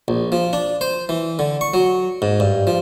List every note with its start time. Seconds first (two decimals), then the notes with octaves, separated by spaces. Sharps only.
0.08 A#1
0.32 F3
0.53 D4
0.81 C5
1.09 E3
1.39 D3
1.61 C#6
1.74 F#3
2.22 G#2
2.40 G2
2.67 F3